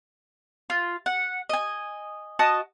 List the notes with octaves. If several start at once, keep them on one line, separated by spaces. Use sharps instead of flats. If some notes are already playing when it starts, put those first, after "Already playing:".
F4
F#5
D#5 G#5
F#4 D#5 A5 D#6